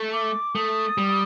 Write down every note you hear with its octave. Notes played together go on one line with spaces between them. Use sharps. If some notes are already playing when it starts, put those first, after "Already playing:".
Already playing: A3
D6
A3 D#6
G3